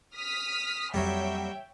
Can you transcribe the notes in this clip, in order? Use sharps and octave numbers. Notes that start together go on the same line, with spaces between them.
D#6 F6 B6
F2 F#3 G3 A#3 C#5 E5 G5